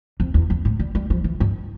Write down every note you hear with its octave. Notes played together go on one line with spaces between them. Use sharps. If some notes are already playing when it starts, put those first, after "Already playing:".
F2
E2
F2
A2
G3
G3
F3
E3
G2